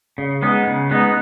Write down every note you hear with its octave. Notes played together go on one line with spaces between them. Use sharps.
C#3
G#3 B3 D#4
C#3
G#3 B3 D#4